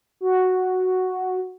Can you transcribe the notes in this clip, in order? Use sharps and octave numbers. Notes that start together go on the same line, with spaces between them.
F#4